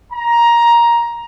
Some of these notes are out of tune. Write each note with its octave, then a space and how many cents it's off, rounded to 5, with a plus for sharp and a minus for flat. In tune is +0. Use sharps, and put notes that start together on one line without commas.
A#5 +15